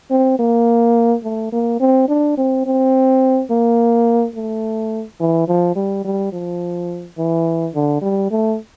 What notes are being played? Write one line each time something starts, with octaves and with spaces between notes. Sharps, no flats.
C4
A#3
A3
A#3
C4
D4
C4
C4
A#3
A3
E3
F3
G3
G3
F3
E3
D3
G3
A3